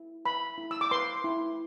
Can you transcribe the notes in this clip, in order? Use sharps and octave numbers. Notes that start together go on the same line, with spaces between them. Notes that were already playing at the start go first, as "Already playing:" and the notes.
Already playing: E4
B4 B5
E4
E6
D6
B4 C6
E4